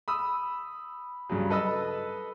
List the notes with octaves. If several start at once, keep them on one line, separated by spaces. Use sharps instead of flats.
B5 D#6 E6
G2 C#3 F#3
A4 B4 D#5 A5 B5 E6